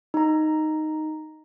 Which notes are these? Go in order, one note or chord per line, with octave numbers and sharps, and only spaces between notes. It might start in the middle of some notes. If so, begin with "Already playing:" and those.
D#4 A#5